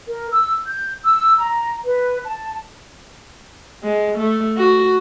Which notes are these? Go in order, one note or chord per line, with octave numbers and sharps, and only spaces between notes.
A#4
E6
G6
E6
A#5
B4
A5
G#3
A3
F#4